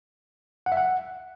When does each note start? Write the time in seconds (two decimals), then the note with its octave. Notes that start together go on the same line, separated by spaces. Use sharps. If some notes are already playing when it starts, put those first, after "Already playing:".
0.66 F#5
0.72 E5
0.77 F#5